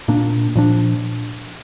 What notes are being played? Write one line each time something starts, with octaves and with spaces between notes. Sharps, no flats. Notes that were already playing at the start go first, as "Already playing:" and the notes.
A#2 A#3 D4
A#2 F3 D4